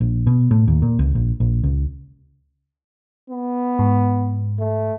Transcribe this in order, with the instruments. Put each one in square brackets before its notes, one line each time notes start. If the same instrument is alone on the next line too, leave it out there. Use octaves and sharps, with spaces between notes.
[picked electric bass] A#1
B2
A2
D#2
A#2
C#2
A#1
A#1
C#2
[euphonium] B3
[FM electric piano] G#2
[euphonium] A3